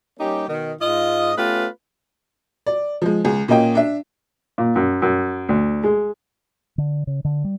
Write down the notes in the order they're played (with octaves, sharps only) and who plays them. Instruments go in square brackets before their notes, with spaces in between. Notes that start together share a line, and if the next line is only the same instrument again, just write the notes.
[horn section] G3 A#3 C#4 D#4 G4
B2 D#3
G#2 F4 D#5
A3 B3 C#4 F4 G4 B4
[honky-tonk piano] D5
F3 G#3
C#2 G#4
A#2 A#3 C#4 D#5 G5
D4 E5
[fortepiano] A#2
F#2
F#2
D2
G#3
[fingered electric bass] D3
C#3
D3
G3